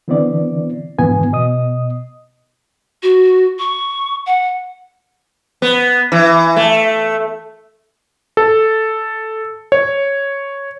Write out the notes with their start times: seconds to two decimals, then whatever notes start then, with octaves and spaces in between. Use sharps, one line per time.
0.08 D3 E3 B3 C4 E4 D5
0.98 F2 G#2 D3 E3 B3 G#5
1.32 B2 D#5 D#6
3.03 F#4
3.59 C#6
4.27 F#5
5.62 B3
6.12 E3
6.57 A3
8.37 A4
9.72 C#5